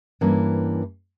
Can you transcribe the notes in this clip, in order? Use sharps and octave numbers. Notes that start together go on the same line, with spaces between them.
G2 E3 A#3 C#4 E4